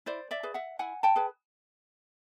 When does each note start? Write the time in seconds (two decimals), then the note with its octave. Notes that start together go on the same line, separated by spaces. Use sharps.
0.06 E4 C5 D5
0.31 D5 E5
0.43 G#4 B4
0.54 E5 F#5
0.79 E4 F#5 G#5
1.03 G5 A5
1.16 G#4 B4